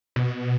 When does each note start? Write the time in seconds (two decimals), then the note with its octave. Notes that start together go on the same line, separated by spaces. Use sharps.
0.16 B2